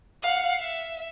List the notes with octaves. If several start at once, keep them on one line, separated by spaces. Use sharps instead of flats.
F5 F#5
E5